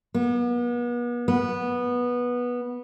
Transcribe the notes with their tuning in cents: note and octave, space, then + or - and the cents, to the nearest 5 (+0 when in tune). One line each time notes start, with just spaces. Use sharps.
B3 -40
B3 -15